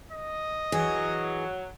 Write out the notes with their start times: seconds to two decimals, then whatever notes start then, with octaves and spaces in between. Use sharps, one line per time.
0.12 D#5
0.72 E3 F#3 G#4